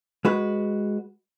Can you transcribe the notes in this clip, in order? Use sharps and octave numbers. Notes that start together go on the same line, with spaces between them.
G#3 F#4 B4